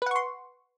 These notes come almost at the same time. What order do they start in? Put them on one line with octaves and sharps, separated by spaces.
B4 F#5 C#6 C6